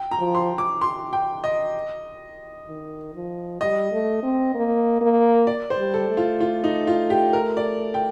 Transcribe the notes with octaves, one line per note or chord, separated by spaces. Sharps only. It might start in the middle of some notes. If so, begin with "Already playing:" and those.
Already playing: G5
A#5
F3
C6
D6
C6
G5
D#5
D#3
F3
G3 D#5
A3
C4
A#3
A#3
D5
C5
G3
A4
A3
F4
F4
D#4
F4
G4
A#4
D5
G5